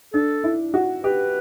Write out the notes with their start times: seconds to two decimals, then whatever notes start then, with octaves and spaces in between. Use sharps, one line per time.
0.14 D4 A4
0.44 E4
0.74 F#4
1.04 G4 B4